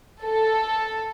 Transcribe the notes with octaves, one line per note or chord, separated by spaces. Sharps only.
A4